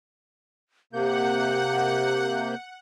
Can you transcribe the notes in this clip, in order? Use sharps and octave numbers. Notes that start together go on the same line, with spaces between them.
C3 A#3 G4 F#5 G6